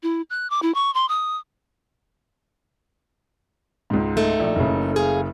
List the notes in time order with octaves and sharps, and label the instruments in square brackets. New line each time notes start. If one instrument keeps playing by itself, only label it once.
[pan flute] E4
F#6
D6
E4
C#6
C6
D#6
[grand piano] C#2 G#2
[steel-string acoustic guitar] A3 D#4
[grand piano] A#1
F#1 C#3
[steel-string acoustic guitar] G#4 F5